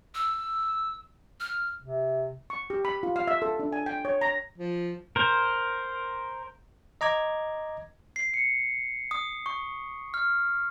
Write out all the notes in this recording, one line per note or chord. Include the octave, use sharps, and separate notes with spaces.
E6
F6
C3
C#6
G4
B5
F4
F5
E5
A4
D4
G#5
G5
C#5
A#5
F3
A#4 C5
D#5 A#5 D6 G#6
C7
C#7
D#6
C#6
F6